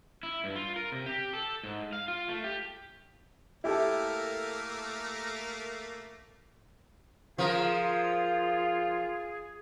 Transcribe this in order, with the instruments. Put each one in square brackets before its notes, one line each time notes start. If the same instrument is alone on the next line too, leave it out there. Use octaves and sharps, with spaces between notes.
[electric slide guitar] E4
G2
F4
A#4
C3
G4
A4
G#2
F5
F4
A3
G4
[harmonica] A3 A#3 A#4 [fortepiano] E4 G4 A4
[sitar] F3 A#4 [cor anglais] F4 [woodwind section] G#4